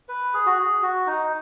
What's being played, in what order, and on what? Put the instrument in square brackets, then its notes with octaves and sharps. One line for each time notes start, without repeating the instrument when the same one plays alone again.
[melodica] B4
G#4
F#4
G#4
F#4
D#4